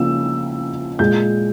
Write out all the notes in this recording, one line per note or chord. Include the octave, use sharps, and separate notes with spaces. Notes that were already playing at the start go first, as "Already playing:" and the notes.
Already playing: C#3 F3 A#3 E6
A#2 G#3 G6